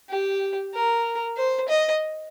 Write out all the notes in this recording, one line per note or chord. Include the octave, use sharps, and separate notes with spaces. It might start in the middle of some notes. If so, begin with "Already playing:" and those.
G4
A#4
C5
D#5